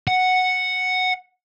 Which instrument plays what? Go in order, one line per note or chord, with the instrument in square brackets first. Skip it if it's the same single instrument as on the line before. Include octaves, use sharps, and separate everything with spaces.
[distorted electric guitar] F#5